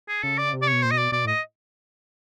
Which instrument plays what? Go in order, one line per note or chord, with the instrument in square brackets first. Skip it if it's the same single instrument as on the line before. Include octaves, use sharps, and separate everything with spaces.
[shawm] G#4
[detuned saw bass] C#3 [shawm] A4
[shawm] D5
[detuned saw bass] C3
[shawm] D5
[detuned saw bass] B2 [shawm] C#5
[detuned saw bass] A#2 [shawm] C5
[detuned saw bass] B2 [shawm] D#5
[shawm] D5
[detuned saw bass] B2 [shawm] D5
[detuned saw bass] A2 [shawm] D#5